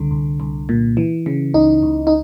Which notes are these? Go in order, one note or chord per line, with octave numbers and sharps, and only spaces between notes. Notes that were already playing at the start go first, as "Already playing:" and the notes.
Already playing: C2 D3
C2
C2
A#2
E3
C#3
C#2 D#4
C#2
D#4